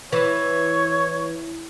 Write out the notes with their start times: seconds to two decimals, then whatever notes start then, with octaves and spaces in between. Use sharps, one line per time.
0.12 E3 C#5